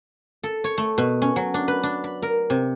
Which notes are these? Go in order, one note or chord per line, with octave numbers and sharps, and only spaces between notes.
A4
C#5
A3
B2
C#4
F#3
D4
B4
D4
B5
A#4
C3